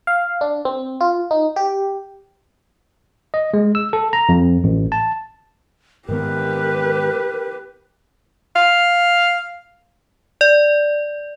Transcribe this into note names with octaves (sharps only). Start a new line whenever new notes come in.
F5
D4
C4
F4
D#4
G4
D#5
G#3
E6
A4
A#5
F2
A1
A5
G#2 D#3 B3 G4 A#4 B4
F5
D5